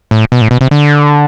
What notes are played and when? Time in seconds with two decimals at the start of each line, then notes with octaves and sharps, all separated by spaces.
0.11 A2
0.32 B2
0.41 A2
0.51 B2
0.61 C3
0.71 D3